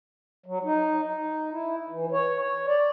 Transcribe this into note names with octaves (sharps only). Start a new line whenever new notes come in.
F#3
D#4
D#4
E4
E3
C#5
C#5
D5